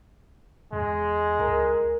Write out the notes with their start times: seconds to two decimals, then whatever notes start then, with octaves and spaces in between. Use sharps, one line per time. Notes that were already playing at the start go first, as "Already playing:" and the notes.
0.73 E2 G#3
1.39 C#2 A#4